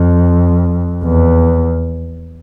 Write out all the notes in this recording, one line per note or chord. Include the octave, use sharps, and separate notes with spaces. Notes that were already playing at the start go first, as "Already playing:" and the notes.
Already playing: F2
E2